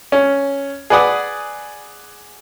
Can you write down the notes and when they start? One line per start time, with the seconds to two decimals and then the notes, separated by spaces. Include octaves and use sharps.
0.12 C#4
0.90 G#4 B4 D5 F#5 D#6